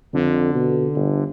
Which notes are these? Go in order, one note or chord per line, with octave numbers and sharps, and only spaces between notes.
F2 D3
B2
G1